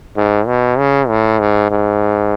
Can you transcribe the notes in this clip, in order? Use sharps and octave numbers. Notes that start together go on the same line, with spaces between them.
G#2
B2
C#3
A2
G#2
G#2